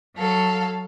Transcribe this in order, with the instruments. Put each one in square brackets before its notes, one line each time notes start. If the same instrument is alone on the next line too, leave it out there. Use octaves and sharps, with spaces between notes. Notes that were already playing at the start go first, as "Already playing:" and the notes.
[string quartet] F#3 A4 F5